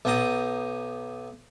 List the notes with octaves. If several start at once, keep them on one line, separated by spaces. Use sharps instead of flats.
B1 B3 G5 A#5 D#6